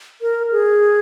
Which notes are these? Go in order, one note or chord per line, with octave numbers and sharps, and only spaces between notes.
A#4
G#4